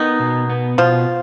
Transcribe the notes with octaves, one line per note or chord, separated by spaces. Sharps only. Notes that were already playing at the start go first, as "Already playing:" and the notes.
Already playing: D#3 B3 D#4
B2
B3
B2 F3 F4